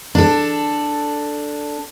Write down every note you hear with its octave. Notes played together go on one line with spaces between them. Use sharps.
D4 A4